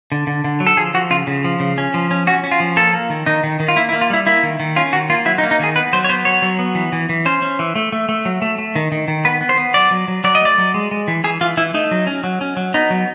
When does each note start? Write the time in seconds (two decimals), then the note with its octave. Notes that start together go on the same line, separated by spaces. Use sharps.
0.12 D3
0.27 D3
0.44 D3
0.60 F#3
0.67 A4
0.77 F3 G#4
0.94 F3 F#4
1.10 C#3 F4
1.27 C#3
1.45 F3
1.60 C#3
1.78 C#4
1.94 F3
2.11 C#4
2.27 C#4 F#4
2.44 C#4
2.51 F4
2.60 F3
2.77 A#3 A4
2.93 A#3
3.10 D#3
3.26 D#3 D#4
3.44 D#3
3.60 D#3
3.68 F4
3.76 A#3 E4
3.89 E4
3.93 A#3
4.01 F4
4.10 G3 E4
4.27 A#3 E4
4.43 D#3
4.60 D#3
4.76 C#4 F4
4.93 D#3 F#4
5.10 A#3 F4
5.25 F#3 E4
5.38 D#4
5.43 A#3
5.51 D#4
5.60 D#3 G#4
5.76 B3 B4
5.93 F#3 C5
6.04 C#5
6.09 B3 C5
6.25 F#3 C#5
6.42 F#3
6.59 B3
6.75 E3
6.92 E3
7.09 E3
7.26 C#4 C5
7.42 C#4
7.59 E3
7.76 A3
7.92 A3
8.09 A3
8.25 F#3
8.42 A3
8.58 A3
8.76 D#3
8.92 D#3
9.08 D#3
9.25 B3 B4
9.41 B3
9.49 C5
9.58 B3
9.74 F#3 D5
9.91 F#3
10.08 F#3
10.24 F#3 D5
10.35 D#5
10.41 A3 D5
10.58 F#3
10.74 G#3
10.91 G#3
11.08 E3
11.24 E3 G#4
11.41 E3 F4
11.57 E3 E4
11.74 A3 D#4
11.91 F#3
12.07 C#4
12.24 F#3
12.41 C#4
12.57 F#3
12.74 B3 D#4
12.90 F#3